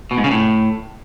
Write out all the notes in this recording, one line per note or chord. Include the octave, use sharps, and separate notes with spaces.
B2
G#2
C#3
A2